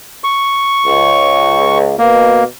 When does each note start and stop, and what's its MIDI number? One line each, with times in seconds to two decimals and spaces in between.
0.24 1.78 85
0.86 1.94 37
1.98 2.43 47
1.98 2.44 58